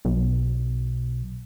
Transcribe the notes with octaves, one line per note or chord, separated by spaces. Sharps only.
B1